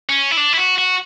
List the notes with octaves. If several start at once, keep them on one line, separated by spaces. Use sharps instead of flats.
C#4
E4
D4
E4
F#4
F#4